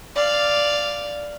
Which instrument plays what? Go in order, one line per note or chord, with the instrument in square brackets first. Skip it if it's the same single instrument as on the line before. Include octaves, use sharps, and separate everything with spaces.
[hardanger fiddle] D5 F5